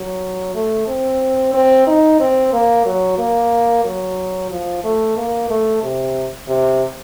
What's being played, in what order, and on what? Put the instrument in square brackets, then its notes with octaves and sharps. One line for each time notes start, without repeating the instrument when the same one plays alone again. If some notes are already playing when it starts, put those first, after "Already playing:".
Already playing: [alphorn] F#3
A3
C4
C4
D#4
C4
A#3
F#3
A#3
F#3
F3
A3
A#3
A3
C3
C3